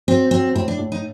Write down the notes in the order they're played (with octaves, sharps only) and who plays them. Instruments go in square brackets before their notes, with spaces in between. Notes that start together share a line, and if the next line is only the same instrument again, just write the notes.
[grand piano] F#3 [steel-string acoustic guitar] C4
[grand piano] F#3 [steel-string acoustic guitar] C4
[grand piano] A2 [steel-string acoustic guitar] C4
[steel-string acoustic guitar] D4
[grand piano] A2
[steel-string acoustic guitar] D#4